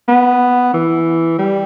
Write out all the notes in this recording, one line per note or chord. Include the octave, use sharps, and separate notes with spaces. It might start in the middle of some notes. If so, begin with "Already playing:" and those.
B3
E3
G3